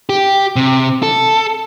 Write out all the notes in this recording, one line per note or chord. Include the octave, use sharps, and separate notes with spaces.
G4
C3
A4